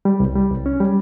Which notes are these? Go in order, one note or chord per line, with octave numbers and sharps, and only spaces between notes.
G3
C2
G3
C2
C#4
G3